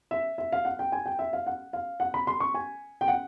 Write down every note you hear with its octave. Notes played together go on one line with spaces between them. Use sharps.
E5
E5
F5
F#5
G5
G#5
G5
E5
F5
F#5
F5
F#5
B5
C6
C#6
G#5
G5
F#5